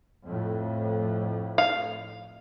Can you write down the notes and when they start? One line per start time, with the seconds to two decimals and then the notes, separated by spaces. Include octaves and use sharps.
0.25 F2 A2
1.58 F5